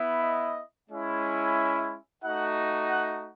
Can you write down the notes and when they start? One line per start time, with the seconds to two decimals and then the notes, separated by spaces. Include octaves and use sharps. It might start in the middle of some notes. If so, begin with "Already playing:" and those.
Already playing: B3 E4
0.21 D#5
0.89 G#3 C#4 E4
1.56 E5
2.23 A3 D#4 F#4 F#5
2.90 F#5